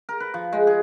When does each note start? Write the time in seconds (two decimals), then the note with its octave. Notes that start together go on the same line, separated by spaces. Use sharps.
0.09 A#4
0.20 B4
0.34 F3
0.53 G#3
0.67 G#4